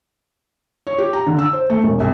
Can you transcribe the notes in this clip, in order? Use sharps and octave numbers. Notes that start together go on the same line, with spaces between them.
C#5
G4
A#5
D3
E6
C5
A3
E1
C2